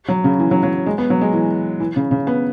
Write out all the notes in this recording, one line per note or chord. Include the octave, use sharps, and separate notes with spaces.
F#3
C#3
E3
F#3
F#3
G#3
B3
F#3
G#3
E3
E3
C#3
C#3
B3